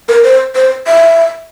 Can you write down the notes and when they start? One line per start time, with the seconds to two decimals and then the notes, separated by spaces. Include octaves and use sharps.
0.09 A#4
0.24 C5
0.55 C5
0.87 E5